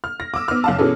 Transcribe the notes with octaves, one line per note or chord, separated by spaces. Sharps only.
F6
A#6
D6 E6
B3 F6
F#1 F5 A5
B2 E3 C#4 G#4 A4